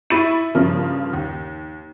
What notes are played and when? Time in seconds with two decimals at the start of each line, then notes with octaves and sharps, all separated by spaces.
0.10 E4 B5 C#6 A6 D#7
0.55 G2 C#3 F3 A#3
1.13 D#2